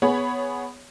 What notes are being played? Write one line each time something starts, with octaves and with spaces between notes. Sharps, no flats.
B3 G#4 C#5 B5